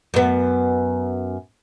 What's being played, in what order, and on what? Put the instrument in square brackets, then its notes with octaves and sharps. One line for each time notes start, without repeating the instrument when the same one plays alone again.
[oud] F#2 B3